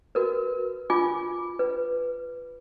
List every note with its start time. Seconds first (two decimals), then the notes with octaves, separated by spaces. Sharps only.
0.15 F#4 A#4 B4
0.90 F4 G#5 D6
1.59 B4